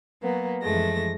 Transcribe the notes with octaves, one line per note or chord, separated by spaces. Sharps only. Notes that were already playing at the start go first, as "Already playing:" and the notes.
F#3 A#3 B3
F#2 E3 F3 G#3 A3 A#6